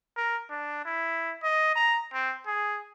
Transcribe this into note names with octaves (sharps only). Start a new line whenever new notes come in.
A#4
D4
E4
D#5
A#5
C4
G#4